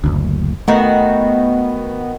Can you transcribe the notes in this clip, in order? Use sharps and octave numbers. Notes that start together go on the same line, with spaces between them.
F#1 D2
D#3 A3 B3 F#4